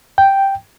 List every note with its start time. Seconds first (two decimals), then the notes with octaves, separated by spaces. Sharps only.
0.18 G5